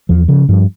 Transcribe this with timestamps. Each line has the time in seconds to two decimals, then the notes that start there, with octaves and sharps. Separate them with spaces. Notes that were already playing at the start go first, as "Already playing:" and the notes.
0.09 E2 F3
0.28 C#3 F3
0.49 G2 F3